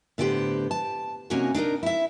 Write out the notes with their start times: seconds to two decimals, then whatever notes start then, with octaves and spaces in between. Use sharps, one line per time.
0.18 A2 D3 B3 G4 C5
0.71 A5
1.30 C3 A#3 C#4 D#4 F#4 G#5
1.54 D4 D#4 A4 A#4
1.83 E4 E5